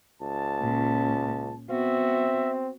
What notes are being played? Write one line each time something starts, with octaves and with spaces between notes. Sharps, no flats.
C#2 A5
A#2 C#4
B3 C4 F#4 E5